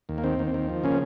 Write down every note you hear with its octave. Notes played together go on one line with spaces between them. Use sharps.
D#2
A#3
D#3 C4
D#2
C4
D#3
F3
C#3 A#3 C#4